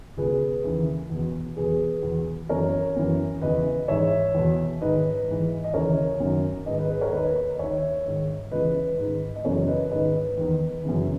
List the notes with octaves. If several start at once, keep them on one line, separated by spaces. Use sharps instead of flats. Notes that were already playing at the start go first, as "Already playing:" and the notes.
C#2 B2 G#4 B4
D#2 C#3 E3
E2 B2
E2 B2 G#4 B4
E2 B2
F#2 E3 A#4 C#5
F#2 E3
E2 C#3 E3 B4 D#5
G#2 E3 C#5 E5
E2 B2
G#2 D#3 B4 D#5
G#2 E3
D#5
D#2 C#3 E3 A#4 C#5
F#2 D#3
G#2 D#3 B4 D#5
B4 D#5
G#4 B4
A#4 C#5
D#2 D#3 B4 D#5
D#2 D#3 C#5 E5
G#2 D#3
C#2 C#3 E3 B4 D#5
G#2 D#3
D#5
F#2 C#3 E3 A#4 C#5
B4 D#5
G#2 D#3 B4 D#5
E2 D#3
F#2 C#3 E3